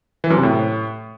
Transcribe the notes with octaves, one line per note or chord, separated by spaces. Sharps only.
E3
F#2
C3
A2